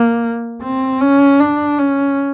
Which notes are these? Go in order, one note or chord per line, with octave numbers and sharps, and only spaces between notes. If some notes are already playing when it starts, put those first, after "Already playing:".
Already playing: A#3
C4
C#4
D4
C#4